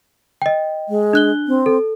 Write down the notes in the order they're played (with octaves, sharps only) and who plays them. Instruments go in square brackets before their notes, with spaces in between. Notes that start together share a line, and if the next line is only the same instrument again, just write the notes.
[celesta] D#5 G5
[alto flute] G#3
[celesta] D4 F#6 G7
[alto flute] C4
[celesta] A4